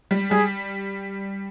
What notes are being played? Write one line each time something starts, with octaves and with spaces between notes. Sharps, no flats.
G3
G3 G#4